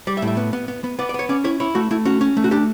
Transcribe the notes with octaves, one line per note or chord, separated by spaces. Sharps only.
G3 D5
E5
A2
E5
B3
B3
B3
B3
B3 D5
D5
B3 C#5
C#4 D5
E4 C#5
E4 C#5
A3 F#4
A3 E4
C#4 F#4
C#4
A3
F#4
D4 G4